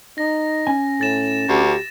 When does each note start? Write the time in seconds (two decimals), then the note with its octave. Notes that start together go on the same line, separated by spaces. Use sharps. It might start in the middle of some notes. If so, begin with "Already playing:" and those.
0.18 D#4 A#6
0.67 C#4 G#5
1.01 A2 A6 E7
1.49 D2 G4